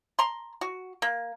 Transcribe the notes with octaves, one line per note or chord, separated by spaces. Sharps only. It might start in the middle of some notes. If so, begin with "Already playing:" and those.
A#5 C6
F#4
A#3